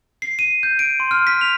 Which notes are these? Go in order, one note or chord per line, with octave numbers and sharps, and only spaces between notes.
C7
D#7
G6
D7
C6
F6
B6
F7